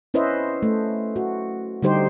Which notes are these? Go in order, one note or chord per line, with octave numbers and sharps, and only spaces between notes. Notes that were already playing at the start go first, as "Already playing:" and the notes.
C#4 E4 B4 C5 D#5 E5
A3
F#4
D3 G3 D#4 G4 C5